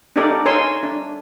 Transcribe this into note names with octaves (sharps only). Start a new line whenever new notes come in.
D4 D#4 G4 A4 A#4 D5
D#4 A#4 C#5 G#5 C6 E6
D4